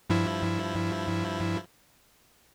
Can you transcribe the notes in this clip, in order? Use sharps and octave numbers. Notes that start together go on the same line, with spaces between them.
G2 F3 E4